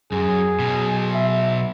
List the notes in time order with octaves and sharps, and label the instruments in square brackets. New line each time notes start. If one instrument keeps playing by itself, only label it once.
[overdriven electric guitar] F#2 [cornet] G#4
[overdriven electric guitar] B1 B2
[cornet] E5